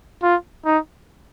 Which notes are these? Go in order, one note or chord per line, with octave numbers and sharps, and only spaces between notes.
F4
D#4